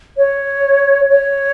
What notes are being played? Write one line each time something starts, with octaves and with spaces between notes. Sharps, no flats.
C#5
C#5